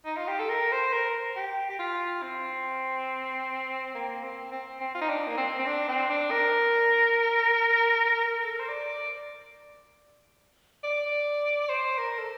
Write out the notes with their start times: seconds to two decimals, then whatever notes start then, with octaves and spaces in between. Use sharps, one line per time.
0.05 D#4
0.17 F4
0.28 G4
0.39 A4
0.49 A#4
0.72 C5
0.93 A#4
1.36 G4
1.69 G4
1.79 F4
2.22 C4
3.94 A#3
4.23 C4
4.52 C4
4.81 C4
4.95 F4
5.01 D#4
5.09 D4
5.27 A#3
5.37 C4
5.59 C4
5.67 D4
5.88 C4
6.09 D4
6.31 A#4
8.25 A#4
8.43 A4
8.51 A#4
8.59 C5
8.68 D5
10.84 D5
11.69 C5
11.98 A#4
12.18 A4